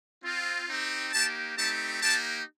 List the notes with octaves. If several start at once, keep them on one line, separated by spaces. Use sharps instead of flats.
C4 F4
C4 D#4 G4
A#3 D#4 G4 A5
A3 C4 D#4 G4 A5
A#3 D#4 G4 A5